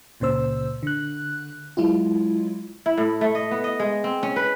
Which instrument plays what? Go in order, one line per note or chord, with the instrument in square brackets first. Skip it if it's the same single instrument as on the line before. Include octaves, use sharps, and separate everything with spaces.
[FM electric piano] C#2 A#2 C#3 C5 E6
D3 F#6
F#3 G#3 E4 F4
[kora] E4
A2
A3
D#5
B3
D#5
G#3
C4
C#4
B4